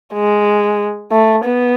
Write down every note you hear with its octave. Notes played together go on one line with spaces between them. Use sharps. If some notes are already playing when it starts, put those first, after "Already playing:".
G#3
A3
B3